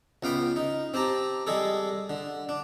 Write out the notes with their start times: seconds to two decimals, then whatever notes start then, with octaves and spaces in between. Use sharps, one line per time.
0.23 C#2 B3 F5 G5 B5
0.56 D#4
0.94 C4 G4 A5 A#5
1.47 G3 G#3 G#4 A4
2.10 D3
2.49 D4